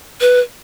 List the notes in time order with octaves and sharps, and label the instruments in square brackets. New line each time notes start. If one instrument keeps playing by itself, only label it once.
[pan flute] B4